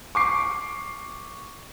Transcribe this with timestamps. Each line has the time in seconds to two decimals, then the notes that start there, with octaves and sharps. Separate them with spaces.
0.15 C#6 D6 C7